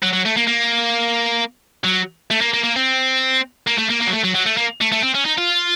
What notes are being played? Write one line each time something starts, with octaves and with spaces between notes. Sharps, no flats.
F#3
F#3
A3
A#3
A#3
F#3
A3
A#3
A#3
A#3
C4
A#3
A3
A#3
A#3
F#3
A3
F#3
F#3
A3
A#3
A3
A3
C4
C#4
D#4
F4